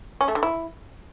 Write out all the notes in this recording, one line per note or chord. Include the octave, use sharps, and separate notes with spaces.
C#4
A3
D3
E4